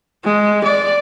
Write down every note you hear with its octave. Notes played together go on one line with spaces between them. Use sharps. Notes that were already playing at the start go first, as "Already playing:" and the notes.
G#3
D5